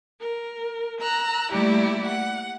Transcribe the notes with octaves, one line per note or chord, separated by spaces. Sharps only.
A#4
A#5 E6 F#6
G3 A3 A#3 E4 G4 D5
F#5